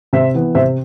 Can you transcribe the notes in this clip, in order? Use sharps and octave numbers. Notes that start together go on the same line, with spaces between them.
C3 C5 E5
E3 B3
C3 C5 E5